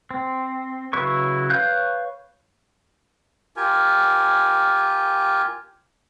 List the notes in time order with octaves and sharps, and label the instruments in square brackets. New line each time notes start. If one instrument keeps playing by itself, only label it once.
[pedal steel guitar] C4
C#3 F#3 E4 B4 C#6
B4 C#5 F5 F#6 G6
[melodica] F4 G4 A#4 G#5